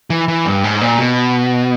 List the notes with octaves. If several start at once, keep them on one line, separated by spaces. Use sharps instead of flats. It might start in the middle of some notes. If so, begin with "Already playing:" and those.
E3
E3
G2
G#2
A#2
B2